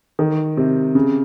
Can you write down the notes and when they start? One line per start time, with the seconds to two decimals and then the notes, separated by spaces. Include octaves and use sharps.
0.19 D#3
0.57 C3
0.95 C#3